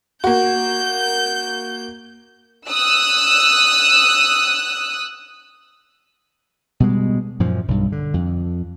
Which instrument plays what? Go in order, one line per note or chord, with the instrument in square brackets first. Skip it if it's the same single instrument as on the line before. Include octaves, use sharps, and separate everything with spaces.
[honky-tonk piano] A#3 F#4 [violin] G6
[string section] D#6 E6 F#6
[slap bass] B2 G3 G#3
F#2 A#2 F3
B1 G2
D3
F2